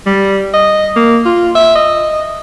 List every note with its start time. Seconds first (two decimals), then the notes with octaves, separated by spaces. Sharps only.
0.06 G3
0.54 D#5
0.96 A#3
1.26 F4
1.56 E5
1.76 D#5